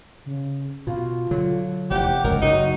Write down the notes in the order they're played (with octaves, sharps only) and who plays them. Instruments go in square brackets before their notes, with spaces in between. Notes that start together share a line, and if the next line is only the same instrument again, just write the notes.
[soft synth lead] C#3
[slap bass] B2 [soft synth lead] F4
[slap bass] D3 F#3
[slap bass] F1 E2 [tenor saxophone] G4 [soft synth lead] F#5
[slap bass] F1 C#2 F#2 [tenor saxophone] A#4
[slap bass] F#1 [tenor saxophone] D#4 [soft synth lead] F#4